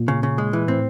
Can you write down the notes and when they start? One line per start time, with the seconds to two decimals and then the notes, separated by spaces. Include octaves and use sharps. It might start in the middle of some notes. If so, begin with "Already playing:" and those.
Already playing: A#2
0.08 C#3
0.23 C#3
0.38 G#3
0.53 E3
0.68 A2 C4